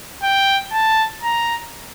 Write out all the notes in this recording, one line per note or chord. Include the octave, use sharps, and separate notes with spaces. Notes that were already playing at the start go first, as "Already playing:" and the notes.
G5
A5
A#5